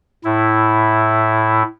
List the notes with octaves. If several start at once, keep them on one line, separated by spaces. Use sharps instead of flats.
A2 E4